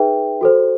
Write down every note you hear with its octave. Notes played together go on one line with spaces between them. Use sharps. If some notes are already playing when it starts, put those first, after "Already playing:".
Already playing: D#4 G#4 B4 E5 G5
F#4 A4 C5